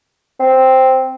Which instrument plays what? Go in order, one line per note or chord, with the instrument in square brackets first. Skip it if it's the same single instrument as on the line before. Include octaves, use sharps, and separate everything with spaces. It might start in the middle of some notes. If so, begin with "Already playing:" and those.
[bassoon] C4